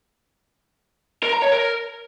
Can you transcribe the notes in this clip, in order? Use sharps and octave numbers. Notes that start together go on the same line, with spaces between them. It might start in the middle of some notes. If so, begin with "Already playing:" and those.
A#4
A#5
C#5
A#4